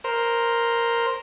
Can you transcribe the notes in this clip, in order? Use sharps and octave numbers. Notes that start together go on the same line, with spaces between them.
A#4 C5